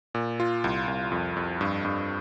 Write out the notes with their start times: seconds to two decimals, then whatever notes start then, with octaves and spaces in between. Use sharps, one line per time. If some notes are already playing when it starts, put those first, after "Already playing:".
0.14 A#2
0.40 F4
0.64 C2
0.88 C2
1.12 F2
1.37 F2
1.61 G2
1.85 G2